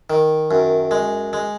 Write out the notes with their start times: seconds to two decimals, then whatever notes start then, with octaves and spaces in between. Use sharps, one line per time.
0.10 D#3
0.51 F#2
0.91 G#3
1.33 G#3